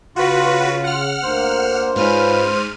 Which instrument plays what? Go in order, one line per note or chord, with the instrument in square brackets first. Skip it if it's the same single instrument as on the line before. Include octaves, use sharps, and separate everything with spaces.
[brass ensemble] C#3 [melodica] F4 [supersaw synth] F#4 B4
[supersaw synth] F#5 F6
[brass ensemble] D2 A#3 [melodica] C5
[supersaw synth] G#2 F6 D#7 [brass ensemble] C#4 F4 B4